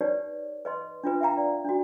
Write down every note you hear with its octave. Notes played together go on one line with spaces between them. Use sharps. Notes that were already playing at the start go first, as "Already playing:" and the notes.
D#4 G4 B4 C#5 D5
B4 D#5 C6
D4 F4 B4
E5 F5 G5 A#5
D5
D4 F#4